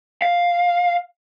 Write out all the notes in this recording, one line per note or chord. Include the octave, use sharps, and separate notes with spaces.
F5